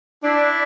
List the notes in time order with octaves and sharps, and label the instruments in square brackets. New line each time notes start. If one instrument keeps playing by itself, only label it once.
[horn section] D4 [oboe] E4